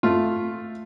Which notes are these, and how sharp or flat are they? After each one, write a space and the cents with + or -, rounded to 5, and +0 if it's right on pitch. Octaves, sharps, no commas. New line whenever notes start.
A3 +0 F4 +0